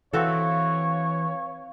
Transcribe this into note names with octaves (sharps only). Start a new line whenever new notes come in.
E3 C4 F#4 A4 C#5 F5